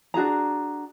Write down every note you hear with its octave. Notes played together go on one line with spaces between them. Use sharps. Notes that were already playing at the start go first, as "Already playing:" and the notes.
D4 F#4 G#4 A#5